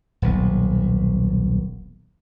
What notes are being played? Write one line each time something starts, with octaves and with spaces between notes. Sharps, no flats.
D#1 B1